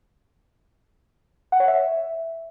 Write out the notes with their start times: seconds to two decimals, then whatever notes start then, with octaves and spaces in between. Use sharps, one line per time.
1.52 F#5
1.60 C#5
1.68 E5